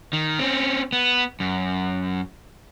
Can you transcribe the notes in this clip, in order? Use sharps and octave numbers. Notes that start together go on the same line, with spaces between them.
D#3
C4 C#4
B3
F#2